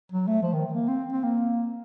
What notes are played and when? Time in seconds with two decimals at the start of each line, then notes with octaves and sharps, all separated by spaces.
0.12 F#3
0.27 A3
0.43 F3
0.53 D#3
0.73 A#3
0.88 C4
1.13 C4
1.24 A#3